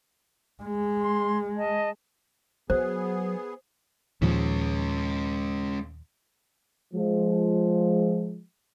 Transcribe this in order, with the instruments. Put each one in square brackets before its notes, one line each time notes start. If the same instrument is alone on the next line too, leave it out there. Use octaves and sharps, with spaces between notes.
[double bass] G#3
[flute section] C6
D#5 A5
[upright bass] F#3 [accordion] B3 G#4 [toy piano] C5
[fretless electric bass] D#2 A#2 F3 [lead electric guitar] G#3 C#4
[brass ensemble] F3 G#3